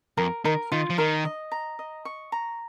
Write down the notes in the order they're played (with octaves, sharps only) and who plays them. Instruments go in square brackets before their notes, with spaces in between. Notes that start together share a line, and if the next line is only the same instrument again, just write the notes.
[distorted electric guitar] F2 [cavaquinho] A#4
[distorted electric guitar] D#3 [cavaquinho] A#4
[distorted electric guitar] D#3 [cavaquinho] F4
[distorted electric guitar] F3
[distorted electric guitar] D#3 [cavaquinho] A#4
[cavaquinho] D#5
A#5
D#5
C#6
A#5